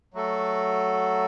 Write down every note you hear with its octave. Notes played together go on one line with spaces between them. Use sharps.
F#3 A3 F#4 A4